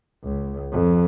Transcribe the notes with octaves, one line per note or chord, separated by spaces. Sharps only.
C#2
F2